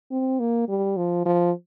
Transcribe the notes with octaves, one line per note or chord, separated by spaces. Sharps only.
C4
A#3
G3
F3
F3